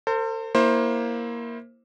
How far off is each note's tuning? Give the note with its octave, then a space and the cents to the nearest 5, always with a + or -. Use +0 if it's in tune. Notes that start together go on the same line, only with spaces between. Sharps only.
A4 +45 C5 +0
A#3 +10 E4 +0 C5 +20